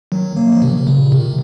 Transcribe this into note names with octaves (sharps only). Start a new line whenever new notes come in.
D#3 F#3
F#3 A#3
F3
C3 D#3
C3
A#2 C#3
C3 D#3